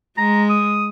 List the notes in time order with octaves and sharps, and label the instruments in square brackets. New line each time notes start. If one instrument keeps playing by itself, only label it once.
[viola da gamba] G#3 [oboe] A#5
[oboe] D#6